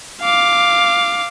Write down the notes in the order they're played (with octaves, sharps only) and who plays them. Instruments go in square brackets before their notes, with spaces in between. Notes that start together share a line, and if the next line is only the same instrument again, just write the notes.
[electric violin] F5 D6